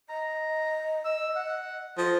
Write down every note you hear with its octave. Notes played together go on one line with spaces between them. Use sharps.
D#5 A#5
E6
F#5
F3 A4 D#5